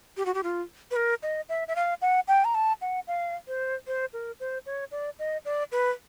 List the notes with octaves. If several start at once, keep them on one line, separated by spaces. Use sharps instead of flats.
G4
F#4
G4
F4
B4
A#4
D#5
E5
E5
F5
F#5
G5
A#5
A5
F#5
F5
C5
C5
A#4
C5
C#5
D5
D#5
D5
B4